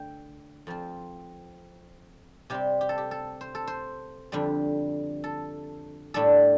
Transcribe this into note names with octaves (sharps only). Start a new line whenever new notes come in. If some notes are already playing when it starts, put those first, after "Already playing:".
Already playing: D3 A3 G5
F2 F3 C4
C3 G3 C4 G4
G4
A4
G4
A4
C5
A4
C5
F2 D3 G3
A4
A2 G3 D4 A4